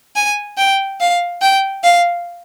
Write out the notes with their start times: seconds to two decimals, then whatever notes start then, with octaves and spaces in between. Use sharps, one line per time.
0.16 G#5
0.57 G5
1.00 F5
1.42 G5
1.84 F5